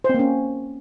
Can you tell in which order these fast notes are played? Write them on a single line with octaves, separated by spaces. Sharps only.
C5 C4 A#3 C#4